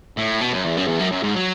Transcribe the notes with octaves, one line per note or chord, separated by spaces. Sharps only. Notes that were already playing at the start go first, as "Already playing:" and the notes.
A2
B2
F#2
E2
F#2
E2
F#2
F#2
G#2
F#3